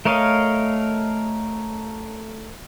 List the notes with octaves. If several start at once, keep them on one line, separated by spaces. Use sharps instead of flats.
A3 A#4 C#5 D#5 F5